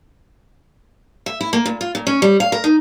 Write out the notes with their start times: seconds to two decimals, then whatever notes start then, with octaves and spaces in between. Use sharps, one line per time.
1.26 E5
1.41 E4
1.53 A#3
1.66 A#2
1.81 F4
1.95 A#2
2.07 C#4
2.22 G3
2.40 F5
2.52 A#4
2.64 D#4